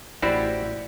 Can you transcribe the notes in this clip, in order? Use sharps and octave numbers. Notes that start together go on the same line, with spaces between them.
A1 E4 F#4 G4 C5 D5